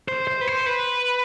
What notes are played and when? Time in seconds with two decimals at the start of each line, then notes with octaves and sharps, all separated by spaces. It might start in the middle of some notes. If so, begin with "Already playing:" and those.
0.08 C5
0.27 C5
0.41 B4
0.48 C5
0.66 B4